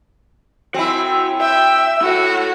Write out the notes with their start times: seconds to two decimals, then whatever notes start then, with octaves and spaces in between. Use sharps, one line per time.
0.74 C4 E4 F#4 G#5
1.41 E5 G5 E6
2.02 E4 F#4 A4